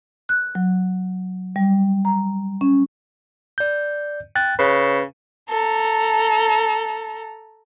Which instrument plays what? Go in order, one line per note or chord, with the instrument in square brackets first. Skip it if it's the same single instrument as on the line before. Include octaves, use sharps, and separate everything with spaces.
[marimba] F#6
F#3
G3
A#5
C#4
[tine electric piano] D5 G6
G5 F#6 A6
[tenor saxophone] C#3 [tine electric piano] B4
[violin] A4 A#5